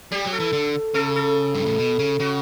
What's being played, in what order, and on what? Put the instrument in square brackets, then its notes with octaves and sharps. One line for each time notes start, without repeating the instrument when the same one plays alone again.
[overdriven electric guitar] G3 [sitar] G4
[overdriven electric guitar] F#3
[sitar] A4
[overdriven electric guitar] E3
D3
[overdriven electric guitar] C#3 [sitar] A4
[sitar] A4
[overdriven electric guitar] G2
A2
B2
C#3
[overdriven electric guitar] C#3 [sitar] F#4